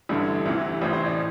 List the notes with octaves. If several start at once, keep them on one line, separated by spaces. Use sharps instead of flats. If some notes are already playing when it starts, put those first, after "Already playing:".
A1 G2 D3 E4
D2 C3 E3
A1 A2 E3 C5
C5
D5